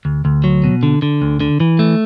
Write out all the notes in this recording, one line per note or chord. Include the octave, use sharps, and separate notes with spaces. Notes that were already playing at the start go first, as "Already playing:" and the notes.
D2
D2
F#3
B2
D3
D3
D2
D3
E3
A3